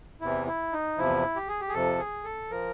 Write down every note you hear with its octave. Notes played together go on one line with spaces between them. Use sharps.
E2 C3 E3 E4
E4
D#4
E2 C3 F3 E4
G4
G#4
G4
G#4
F2 C3 F3 A4
G#4
A4
F3 A#4